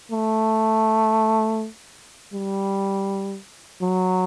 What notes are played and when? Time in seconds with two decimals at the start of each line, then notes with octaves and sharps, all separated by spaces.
0.12 A3
2.34 G3
3.82 F#3